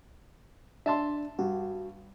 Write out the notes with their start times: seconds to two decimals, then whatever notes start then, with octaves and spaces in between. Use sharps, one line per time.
0.86 D4 E5 A5 C6
1.39 G2 F#4